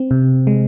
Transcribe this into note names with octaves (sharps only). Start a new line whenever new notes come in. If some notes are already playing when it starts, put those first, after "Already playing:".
Already playing: C4
C3
G#3